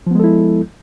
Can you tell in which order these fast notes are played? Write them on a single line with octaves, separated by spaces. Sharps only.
F3 B3 G#3 A4 E4